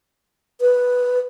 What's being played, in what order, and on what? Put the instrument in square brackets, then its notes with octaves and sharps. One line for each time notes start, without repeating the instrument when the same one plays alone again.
[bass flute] B4